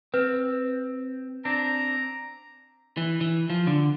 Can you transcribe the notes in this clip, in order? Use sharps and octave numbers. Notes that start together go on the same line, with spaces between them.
C4 B4
C4 D4 A#5
E3
E3
F3
D3